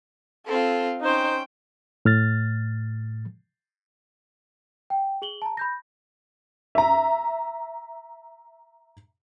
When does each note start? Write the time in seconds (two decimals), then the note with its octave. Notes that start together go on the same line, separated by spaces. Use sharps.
0.46 C4 F4 A4
1.01 C#4 D#4 C5 G5
2.05 A2 F6 A6
4.90 G5
5.22 G#4 F#7 G7
5.42 A5 A#5
5.57 B5 G6 A#6
6.75 E5 A#5